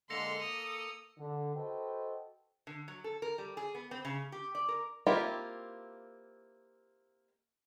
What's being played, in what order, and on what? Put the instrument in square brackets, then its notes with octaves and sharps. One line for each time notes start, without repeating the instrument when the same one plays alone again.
[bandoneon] D3 G#3 A#3 [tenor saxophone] A4 [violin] C6 [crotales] A#6 C#7 F7
[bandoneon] A#3 [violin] D#6 [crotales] F7
[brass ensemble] D3
F#4 A4 B4 C5 D#5 G5
[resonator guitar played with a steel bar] D3
F#3
A4
A#4
G3
G#4
B3
C4
C#3
G4
D5
A#4
[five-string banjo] A#3 C4 E4 F4 G4